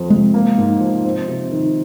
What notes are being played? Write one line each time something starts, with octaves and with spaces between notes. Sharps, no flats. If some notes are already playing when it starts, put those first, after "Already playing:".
Already playing: F2 F3 C4
C3 G#3
A#3
G#2
F3
C4
C3
D#3